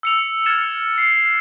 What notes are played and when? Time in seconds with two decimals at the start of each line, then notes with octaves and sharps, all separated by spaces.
0.03 E6 C#7 F7
0.46 F6 G#6 A6 C#7 E7
0.98 C7